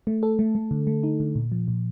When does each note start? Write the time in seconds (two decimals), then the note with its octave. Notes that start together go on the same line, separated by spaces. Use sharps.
0.07 A3
0.23 A4
0.39 A3
0.55 A3
0.71 D3
0.87 A3
1.03 D#4
1.20 D3
1.35 A#2
1.52 F3
1.68 A#2